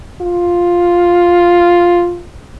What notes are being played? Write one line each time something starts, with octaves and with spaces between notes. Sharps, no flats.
F4